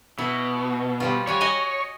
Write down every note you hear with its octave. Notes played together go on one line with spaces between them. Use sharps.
B2 E4
F3 G3 F4
G3 F#4 C#5 G#5
D#5 F#5 G#5